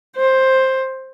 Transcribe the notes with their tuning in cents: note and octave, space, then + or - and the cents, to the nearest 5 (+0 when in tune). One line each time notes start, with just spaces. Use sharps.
C5 +10